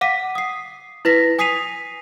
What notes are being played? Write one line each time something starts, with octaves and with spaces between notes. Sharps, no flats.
F5 F#5 D6 B6 D#7
D#6 C7
E4 B4 A#6 B6
G#5 D#6 B6 C7 D#7 F7